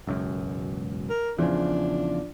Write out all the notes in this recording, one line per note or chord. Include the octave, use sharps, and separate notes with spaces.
E1 C#2 F#2
A#4
E2 C#3 F3 D4 E4 F4